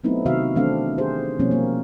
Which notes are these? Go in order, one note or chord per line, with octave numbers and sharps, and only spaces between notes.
F#3 A3 B3 C4 D#4 E4
C3 D#3 F#4 E5 F5
D#3 E3 A3 C4 D4 F5
G4 G#4 C5
B2 F3 G3 A#3 C4 C#4
A#3